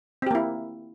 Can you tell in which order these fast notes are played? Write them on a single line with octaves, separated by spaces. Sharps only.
C4 G4 A#3 E4